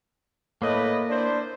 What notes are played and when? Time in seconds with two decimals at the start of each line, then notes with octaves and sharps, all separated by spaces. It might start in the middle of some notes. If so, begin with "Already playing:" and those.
0.62 A2 A#3 B4 D#5
1.09 D4 E4 C5